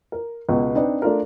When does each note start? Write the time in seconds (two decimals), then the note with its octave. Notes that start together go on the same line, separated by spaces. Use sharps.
0.12 A#4
0.49 C#2 B2
0.75 C4 D4 D#4 B4
1.02 A3 D4 F4 A#4